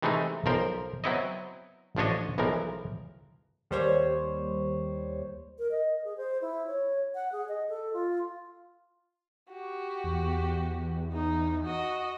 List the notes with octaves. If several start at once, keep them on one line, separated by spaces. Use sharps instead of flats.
C3 E3 G#3 A3 C4 D#4
B1 F3 A#4 C5
F#3 B3 C4 E4 C#5 D#5
A1 F3 D4 C#5 D#5
B1 E3 F3 G#3 A#4
D#2 G3 C5 C#5
A#4
D#5
G#4
C5
E4
C#5
F#5
G#4
D#5
A4
F4
F#4 G4
E2
E2
D#4
F#4 D#5